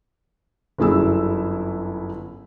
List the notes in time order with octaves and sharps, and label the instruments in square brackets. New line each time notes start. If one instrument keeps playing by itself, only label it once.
[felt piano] G1 F#2 E4 G#4 E6